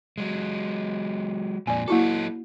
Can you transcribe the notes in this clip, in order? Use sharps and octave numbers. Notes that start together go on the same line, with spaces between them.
F#3 G#3
F2 A#2 D5 G#5
F#3 A#3 E4 F#4 A4